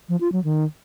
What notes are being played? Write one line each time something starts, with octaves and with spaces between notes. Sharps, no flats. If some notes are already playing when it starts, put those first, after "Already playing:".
F3
F4
F#3
D#3